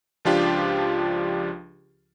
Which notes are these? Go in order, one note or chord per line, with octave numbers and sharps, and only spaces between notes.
C#2 F3 D4 F4 G4